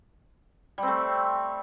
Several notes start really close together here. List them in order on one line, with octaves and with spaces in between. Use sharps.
G3 C4 A3